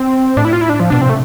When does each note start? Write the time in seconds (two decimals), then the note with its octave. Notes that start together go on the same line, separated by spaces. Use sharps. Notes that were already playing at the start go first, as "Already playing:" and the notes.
Already playing: C4
0.37 A2 D4
0.45 E4
0.53 F4
0.61 E4
0.69 D4
0.80 F3
0.90 B2 D4
1.01 C3 C4
1.09 A3